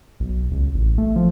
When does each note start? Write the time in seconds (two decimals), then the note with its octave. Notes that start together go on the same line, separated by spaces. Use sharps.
0.20 B1
0.51 C#2
0.74 A1
0.98 A3
1.16 F3